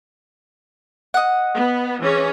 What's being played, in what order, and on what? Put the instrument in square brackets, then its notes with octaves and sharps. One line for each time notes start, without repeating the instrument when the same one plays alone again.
[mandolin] D#5 F#5
[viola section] B3
E3 C#4 G#4